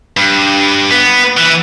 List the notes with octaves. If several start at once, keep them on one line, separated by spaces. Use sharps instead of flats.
G2
B3
E3